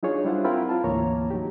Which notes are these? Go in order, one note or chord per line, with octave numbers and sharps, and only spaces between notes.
F#3 D4 D#4 F4 G#4 C#5
G3 D4 E4 F4 C5 F#5
C4 E4 F4 A#4 G5 B5
F4 A5
D2 G#2 E3 A#3 C#5 A#5
F#3 D#4 G4